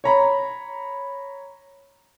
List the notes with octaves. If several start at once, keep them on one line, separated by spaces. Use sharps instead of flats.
C#5 A#5 B5